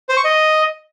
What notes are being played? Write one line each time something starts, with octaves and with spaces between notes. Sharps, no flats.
C5
C#6
D#5